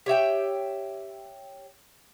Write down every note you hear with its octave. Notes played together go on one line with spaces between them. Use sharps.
G4 C#5 E5 G5